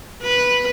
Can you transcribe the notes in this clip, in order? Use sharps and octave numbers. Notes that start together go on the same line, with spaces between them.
B4